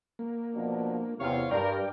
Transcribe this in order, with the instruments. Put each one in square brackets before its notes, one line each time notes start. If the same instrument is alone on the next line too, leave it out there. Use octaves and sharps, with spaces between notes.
[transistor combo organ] A#3
[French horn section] B2 F3 D4
[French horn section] E2 [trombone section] C3 [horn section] F4 C#5 F5
[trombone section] G2 [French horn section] D4 [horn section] A#4 [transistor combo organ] D5 G5